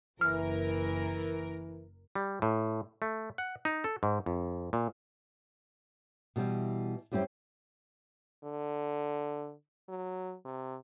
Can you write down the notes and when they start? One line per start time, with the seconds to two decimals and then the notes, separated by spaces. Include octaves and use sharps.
0.21 F#1 E3 A#4 F6
2.15 G3
2.42 A2
3.02 A3
3.38 F#5
3.65 D#4
3.84 A4
4.03 G#2
4.26 F2
4.73 A#2
6.36 B2 E3 G3
7.12 F#2 G3 C4 E4 G4
8.44 D3
9.89 F#3
10.45 C3